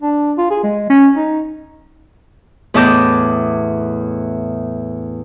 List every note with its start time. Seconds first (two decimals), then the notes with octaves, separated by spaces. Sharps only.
0.02 D4
0.38 F4
0.50 G#4
0.63 G#3
0.90 C#4
1.16 D#4
2.74 E2 A2 D#5 A5 D6 G6